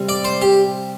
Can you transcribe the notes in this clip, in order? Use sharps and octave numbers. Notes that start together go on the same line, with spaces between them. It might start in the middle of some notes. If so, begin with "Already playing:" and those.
Already playing: C3 G3
D5
C5
G4